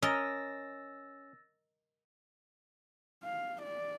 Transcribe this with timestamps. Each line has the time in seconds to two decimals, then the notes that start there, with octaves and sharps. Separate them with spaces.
0.02 C#4 A#4 D#5 E6 A6 A#6
3.24 F5
3.62 D5